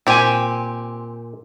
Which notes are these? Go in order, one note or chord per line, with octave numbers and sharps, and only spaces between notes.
A#2 C4 G4 G#5